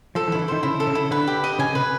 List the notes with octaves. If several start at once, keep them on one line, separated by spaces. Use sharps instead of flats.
F3 A4
E3
D#3 E4
E3
D#3 C5
C#3 E4
A4
C#3
E4
D3 B4
G4
D#5
C#3 G#5
C3 B4